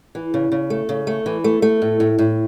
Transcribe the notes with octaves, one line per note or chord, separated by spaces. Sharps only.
E3
C#3
C#3
A3
C#3
A3
E3
A3
A3
A2
A2
A2